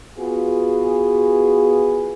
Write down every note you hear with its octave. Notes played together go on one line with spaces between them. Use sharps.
B3 F4 F#4 G#4